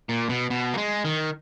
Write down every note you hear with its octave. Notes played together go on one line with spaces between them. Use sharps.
A#2
B2
B2
A#3
G#3
D#3